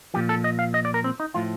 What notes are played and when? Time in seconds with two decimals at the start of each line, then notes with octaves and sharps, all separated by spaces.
0.14 A#2 F3 G4
0.29 A4
0.44 D#5
0.59 F5
0.74 D#5
0.85 D5
0.94 A#4
1.04 C4
1.20 D#4
1.34 A2 F3 F4